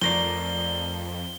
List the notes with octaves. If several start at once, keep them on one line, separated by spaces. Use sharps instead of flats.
F2 F3 A3 A#4 D5 A#6 C7 G7